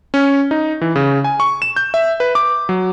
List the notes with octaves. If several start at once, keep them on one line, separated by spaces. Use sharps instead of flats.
C#4
D#4
E3
C#3
G#5
C#6
E7
G6
E5
B4
D6
F#3